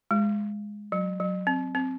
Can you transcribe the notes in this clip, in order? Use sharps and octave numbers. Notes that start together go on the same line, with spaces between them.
G#3
F#3
F#3
C4
C4